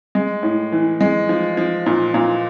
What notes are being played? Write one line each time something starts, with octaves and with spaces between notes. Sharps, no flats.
G#3
A2
E3
G#3
F3
F3
A#2
A#2